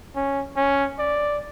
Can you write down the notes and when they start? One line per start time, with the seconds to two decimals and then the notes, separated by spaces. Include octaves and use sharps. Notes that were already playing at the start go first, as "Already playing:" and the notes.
0.16 C#4
0.57 C#4
0.99 D5